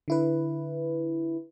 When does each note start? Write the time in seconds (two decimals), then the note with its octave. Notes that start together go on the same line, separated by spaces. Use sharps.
0.08 D3 E4 B4